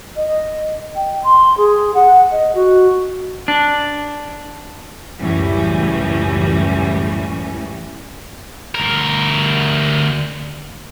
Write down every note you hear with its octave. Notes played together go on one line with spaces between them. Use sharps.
D#5
G5
C6
G#4
F#5
D#5
F#4
D4
C#2 F#2 A2 E3 G3 C#4
D2 A#4